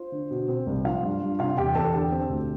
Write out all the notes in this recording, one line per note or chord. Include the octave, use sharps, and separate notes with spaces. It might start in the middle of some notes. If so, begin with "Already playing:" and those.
Already playing: F4 C5
D3
B2
C4
C2
F3 F4 F5
G2
G2
C3 F4 F5
E2 G4 G5
E2 A4 A5
D3 G4 G5
C4
D2